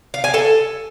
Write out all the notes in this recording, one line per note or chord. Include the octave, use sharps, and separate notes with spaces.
F5
G#5
A4